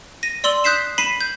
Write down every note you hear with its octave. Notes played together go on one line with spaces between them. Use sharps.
A#6 D#7
D5 C6 E6 F#7
D#6 F#6 G6 B6 C7 E7
B5 B6 C7 D#7 E7
G6